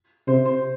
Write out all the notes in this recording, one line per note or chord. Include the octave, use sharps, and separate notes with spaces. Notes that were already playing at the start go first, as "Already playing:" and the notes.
C3 C5
C5